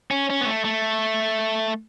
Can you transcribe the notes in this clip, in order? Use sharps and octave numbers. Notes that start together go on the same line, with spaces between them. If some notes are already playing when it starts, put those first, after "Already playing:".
C#4
C#4
B3
A3
A3